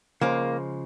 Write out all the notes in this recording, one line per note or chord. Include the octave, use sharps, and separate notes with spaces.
C#3 F3 G#3 A#3